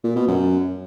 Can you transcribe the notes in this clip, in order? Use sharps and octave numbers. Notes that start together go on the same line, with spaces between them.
A#2
B2
F#2